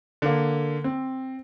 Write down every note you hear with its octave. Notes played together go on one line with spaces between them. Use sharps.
D3 A#3
C4